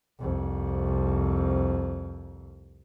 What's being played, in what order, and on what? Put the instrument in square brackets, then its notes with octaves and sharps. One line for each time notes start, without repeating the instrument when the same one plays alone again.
[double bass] C2 F2